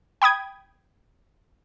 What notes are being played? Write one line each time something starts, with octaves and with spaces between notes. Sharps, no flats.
G5 B5 D#6 G#6